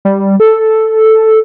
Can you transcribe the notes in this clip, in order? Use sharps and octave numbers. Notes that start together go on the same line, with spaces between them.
G3
A4